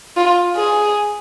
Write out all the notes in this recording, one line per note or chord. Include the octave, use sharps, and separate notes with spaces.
F4
G#4